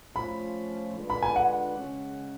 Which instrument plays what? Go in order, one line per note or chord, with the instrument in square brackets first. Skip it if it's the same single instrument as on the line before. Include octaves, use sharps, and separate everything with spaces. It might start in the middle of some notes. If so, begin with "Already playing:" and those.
[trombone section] F3 A3 C#4 F4 [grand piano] B5
[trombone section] D3 G#3 D4 F4 B4
[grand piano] B5
G#5
F#5
[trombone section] C#3 G#3 C#4